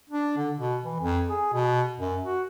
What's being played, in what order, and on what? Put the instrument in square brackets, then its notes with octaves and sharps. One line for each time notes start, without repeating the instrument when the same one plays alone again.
[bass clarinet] D4
D3
B2
E3
F2
G#4
B2
F#2
F#4